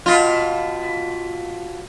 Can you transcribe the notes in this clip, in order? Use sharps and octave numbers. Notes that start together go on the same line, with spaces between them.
B2 F4